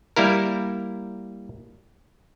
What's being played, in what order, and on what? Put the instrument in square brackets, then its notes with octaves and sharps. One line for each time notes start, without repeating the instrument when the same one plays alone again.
[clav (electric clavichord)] G3 A#3 E4 A#4